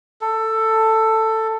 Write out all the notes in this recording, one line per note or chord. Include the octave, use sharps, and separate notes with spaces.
A4